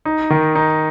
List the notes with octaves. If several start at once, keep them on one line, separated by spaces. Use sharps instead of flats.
D#4
D#3
D#4